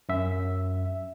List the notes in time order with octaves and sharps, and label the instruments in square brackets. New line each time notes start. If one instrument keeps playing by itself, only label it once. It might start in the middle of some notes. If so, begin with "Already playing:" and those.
[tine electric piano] F#2 E5